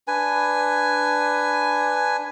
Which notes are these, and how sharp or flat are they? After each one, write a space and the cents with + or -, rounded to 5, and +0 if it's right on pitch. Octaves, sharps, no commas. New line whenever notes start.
D4 +0 B4 +10 G#5 +0